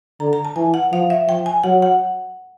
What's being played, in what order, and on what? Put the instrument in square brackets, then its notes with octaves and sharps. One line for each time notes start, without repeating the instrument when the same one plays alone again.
[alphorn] D3 [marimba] A#5
[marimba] A#5
A5
[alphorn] E3 [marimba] G#5
[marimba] F#5
[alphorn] F3 [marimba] F5
[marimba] E5
[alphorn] F3 [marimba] G5
[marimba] G#5
[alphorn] F#3 [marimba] F#5
[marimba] F#5